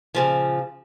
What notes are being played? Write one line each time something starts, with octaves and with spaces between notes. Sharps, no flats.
A#2 C#3 F3